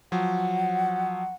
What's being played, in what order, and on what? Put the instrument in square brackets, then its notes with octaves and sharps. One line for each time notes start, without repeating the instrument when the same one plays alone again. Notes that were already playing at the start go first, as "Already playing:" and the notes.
[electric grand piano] F3 F#3 [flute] F#5